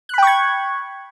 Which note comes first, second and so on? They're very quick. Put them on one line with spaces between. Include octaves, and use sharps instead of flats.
F#6 B5 G5 C#6 G#6